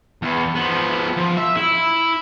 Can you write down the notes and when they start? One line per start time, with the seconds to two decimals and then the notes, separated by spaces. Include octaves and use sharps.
0.22 E2
0.55 F3 B3
1.17 F3
1.37 E5
1.57 E4